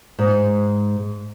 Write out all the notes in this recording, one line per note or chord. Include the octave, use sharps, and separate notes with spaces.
G#2